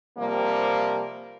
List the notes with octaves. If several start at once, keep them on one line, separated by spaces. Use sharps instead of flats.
C3 F3 G3 A#3